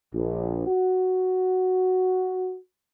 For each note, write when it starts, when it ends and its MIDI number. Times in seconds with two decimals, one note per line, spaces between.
0.13 0.65 34
0.66 2.57 66